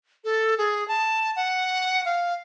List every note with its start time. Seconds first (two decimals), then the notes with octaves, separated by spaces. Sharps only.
0.25 A4
0.58 G#4
0.88 A5
1.36 F#5
2.05 F5